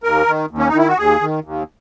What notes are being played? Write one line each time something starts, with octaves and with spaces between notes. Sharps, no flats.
D#2 A#4
D#3
D#2
C#4
D#4
D#3 E4
F#4
D#2 G#4
D#3
D#2